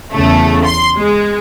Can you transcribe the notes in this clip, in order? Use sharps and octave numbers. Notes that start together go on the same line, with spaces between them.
E2 C#3 A3
C6
G#3